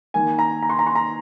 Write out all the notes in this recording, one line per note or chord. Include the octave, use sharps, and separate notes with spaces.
D#3 A#3 G#5
A#5
A#5
C6
A#5
C6
A#5